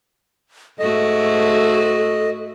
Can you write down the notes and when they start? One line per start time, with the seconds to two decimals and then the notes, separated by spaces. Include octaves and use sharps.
0.79 G#2 A3 F#4 A4 D#5